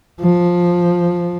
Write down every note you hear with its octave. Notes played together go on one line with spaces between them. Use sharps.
F3